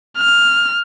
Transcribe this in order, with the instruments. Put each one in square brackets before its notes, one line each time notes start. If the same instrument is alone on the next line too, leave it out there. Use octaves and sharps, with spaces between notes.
[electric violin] F6